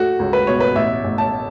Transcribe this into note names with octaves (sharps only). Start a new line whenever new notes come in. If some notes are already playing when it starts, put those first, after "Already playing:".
Already playing: A3 F#4
C#2
B4
B2 C#5
B4
A1 E5
A1
A5